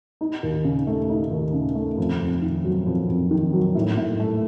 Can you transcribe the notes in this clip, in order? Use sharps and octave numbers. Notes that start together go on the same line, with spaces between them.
D#4
D#2
C#3
A3
D#4
D#2
C#3
A3
F2
F2
D#3
F#3
F2
F2
D#3
F#3
A2
A2
A3